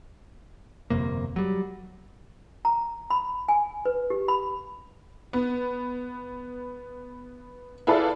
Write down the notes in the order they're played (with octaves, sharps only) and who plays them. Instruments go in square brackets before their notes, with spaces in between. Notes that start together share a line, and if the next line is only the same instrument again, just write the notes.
[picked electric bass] G1 F2 C3 A#3
F#3 G3
[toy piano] A#5
B5
G#5
B4
G4
B5
[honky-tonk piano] B3
E4 F4 G#4 A4 B4 D5